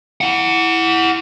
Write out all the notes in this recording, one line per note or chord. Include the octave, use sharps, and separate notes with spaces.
E4 F#5